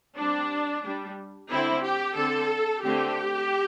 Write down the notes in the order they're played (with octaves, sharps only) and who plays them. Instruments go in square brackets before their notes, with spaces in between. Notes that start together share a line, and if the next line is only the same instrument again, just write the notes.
[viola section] G3 C4 D4
G3 D4
D3 C4 E4
G4
D3 C4 A4
D3 A3 C4 G4